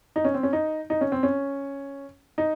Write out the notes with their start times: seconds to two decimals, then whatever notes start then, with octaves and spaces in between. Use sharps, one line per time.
0.16 D#4
0.24 C#4
0.34 C4
0.43 C#4
0.53 D#4
0.90 D#4
1.01 C#4
1.12 C4
1.23 C#4
2.38 D#4